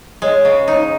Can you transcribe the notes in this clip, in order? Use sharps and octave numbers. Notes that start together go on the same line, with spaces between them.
G#3 C#5
C#3
D#4